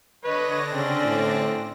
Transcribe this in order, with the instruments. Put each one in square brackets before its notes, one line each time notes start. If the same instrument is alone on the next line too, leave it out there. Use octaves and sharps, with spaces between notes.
[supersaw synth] D3 D4 A#6 [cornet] B4 [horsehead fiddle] C#5 D#5
[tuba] C#3 [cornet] C4 [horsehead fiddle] C#4 D5
[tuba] A2